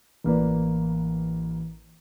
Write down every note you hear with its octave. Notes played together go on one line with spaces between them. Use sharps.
A1 A#3 B4 D5